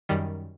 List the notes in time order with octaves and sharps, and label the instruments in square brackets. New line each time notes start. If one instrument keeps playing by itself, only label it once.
[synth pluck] F#2 D#3 G3